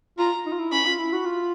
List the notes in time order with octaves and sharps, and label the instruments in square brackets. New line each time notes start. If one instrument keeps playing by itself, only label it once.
[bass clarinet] F4 [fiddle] A#5
[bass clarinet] D#4
F4
E4
[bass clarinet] C#4 [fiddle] B5
[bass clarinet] F4
E4
F#4
F4